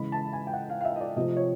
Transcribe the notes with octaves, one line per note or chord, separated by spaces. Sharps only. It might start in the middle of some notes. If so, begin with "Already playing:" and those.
Already playing: C#3 E3 G#3 B5
A5
G#5
G5
F#5
F5
F5
E5
D#5
D5
C3 F3 A3 C4 D#5
C#5